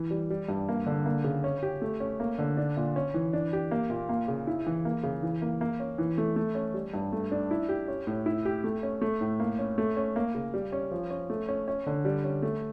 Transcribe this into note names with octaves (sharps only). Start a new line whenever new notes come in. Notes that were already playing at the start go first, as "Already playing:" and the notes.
Already playing: E3
G3
G3
G2
A#3
D3
A#3
C#3
C#4
G4
A3
C#4
A#3
D3
D4
A#2
C#4
E3
D4
G4
A#3
A#2
A#3
C#3
E4
E3
A#3
C#3
E3
A#3
A#3
C#4
E3
A3
A3
C#4
G3
G2
A3
D4
E4
G4
C#4
A2
E4
G4
A3
C#4
A3
A2
A#3
C#4
A3
C#4
A#3
C#3
G3
C#4
F3
C#4
A3
C#4
C#4
D3
G3
C#4
A3